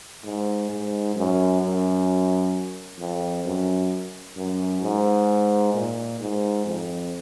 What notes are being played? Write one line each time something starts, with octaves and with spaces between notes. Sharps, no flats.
G#2
G#2
F#2
F#2
F2
F#2
F#2
G#2
A#2
G#2
F2